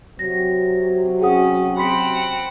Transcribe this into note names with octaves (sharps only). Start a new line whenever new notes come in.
C3 F#3 A#6
C#4 G#4 F#5 D#6
C4 F#5 B5 C6 B6